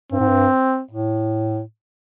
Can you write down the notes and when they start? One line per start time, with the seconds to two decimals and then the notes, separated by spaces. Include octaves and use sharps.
0.12 G2 C4
0.20 G#2
0.28 G2
0.91 A2